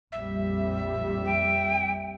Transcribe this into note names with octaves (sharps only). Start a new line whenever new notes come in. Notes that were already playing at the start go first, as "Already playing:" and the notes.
A#1 F2 G3 E5
G5